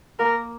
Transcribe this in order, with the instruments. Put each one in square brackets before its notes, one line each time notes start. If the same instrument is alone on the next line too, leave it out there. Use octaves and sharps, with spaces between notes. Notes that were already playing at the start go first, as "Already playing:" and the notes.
[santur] A#3 [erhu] A#4